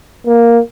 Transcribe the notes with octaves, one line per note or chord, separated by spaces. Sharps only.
A#3